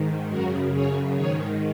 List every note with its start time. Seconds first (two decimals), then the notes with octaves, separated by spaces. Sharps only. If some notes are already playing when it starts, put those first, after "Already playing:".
Already playing: G#2 D#3
0.29 F#2 C#3 F#4 A#4
0.72 G#4 C#5
1.14 G#2 D#3 G#4 C#5